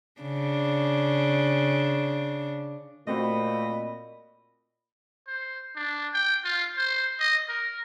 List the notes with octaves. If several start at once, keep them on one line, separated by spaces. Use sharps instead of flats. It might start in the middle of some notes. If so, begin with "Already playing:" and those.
C#3 D4
A#2 A3 C4 F#4 D#5 B5
C5
D4
G5
F4
C5
D#5
A#4